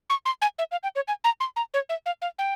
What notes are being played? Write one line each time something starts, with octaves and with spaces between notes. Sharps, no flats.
C#6
C6
G#5
E5
F5
G5
C#5
G#5
A#5
C6
A#5
C#5
E5
F5
F5
G5